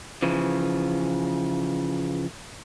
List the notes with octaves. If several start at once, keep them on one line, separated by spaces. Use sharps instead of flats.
C#3 E3 F3